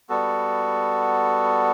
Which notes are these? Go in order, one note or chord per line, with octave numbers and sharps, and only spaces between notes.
G3 B3 F#4 A4